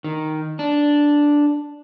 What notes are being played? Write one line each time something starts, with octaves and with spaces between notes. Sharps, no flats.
D#3
D4